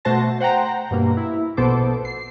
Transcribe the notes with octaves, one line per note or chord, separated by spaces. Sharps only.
B2 A3 F#4 C5 A5 A#6
C5 F#5 G5 A#5
G2 B2 A#3
E4
A#1 B2 B3 A4 C5 D6
C7